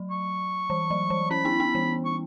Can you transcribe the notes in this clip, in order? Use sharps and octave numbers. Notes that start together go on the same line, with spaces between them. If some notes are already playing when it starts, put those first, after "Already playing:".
Already playing: F#3
C#6
E3
F#3
E3
C#4 B5
B3 E4
B3
E3
C#6